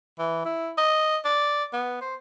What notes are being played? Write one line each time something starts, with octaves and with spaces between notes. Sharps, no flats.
E3
E4
D#5
D5
B3
C5